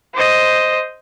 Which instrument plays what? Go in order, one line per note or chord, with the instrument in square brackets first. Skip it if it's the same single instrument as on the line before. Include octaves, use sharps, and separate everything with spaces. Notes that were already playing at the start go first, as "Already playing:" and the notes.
[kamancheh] C5 D#5